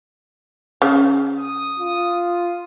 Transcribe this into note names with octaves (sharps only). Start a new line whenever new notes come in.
C#3
D#6
F4